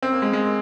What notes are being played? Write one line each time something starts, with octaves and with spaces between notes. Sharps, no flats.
C4
A#3
G#3
G#3